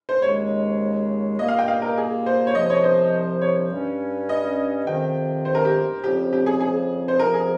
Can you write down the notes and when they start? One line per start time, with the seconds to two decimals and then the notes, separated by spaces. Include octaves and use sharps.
0.09 C5
0.22 D#2 C#3 G#3 C#5
1.39 A#2 G3 A#3 D#5
1.48 F5
1.59 G5
1.68 F5
1.82 A#4
1.97 G#4
2.26 C5
2.47 C#5
2.55 C2 C3 F3 D#5
2.70 C#5
2.84 C5
3.41 C#5
3.71 G2 G3 C#4
4.29 D#5
4.87 F2 C3 D#3 G5
5.45 C5
5.55 A#4
5.65 G4
6.03 F2 C#3 F3 C4 G4
6.33 G4
6.46 G#4
6.60 G#4
7.08 C5
7.19 F2 C3 F3 A#4
7.34 G#4